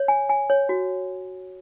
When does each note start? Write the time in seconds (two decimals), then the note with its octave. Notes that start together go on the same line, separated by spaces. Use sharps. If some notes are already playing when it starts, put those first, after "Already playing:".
Already playing: C#5
0.08 G#5
0.29 G#5
0.50 C#5
0.69 F#4